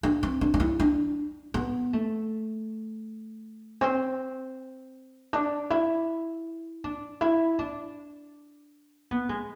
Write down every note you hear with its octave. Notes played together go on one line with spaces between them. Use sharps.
D4
C4
D4
D4
E4
D4
B3
A3
C4
D4
E4
D4
E4
D4
B3
G#3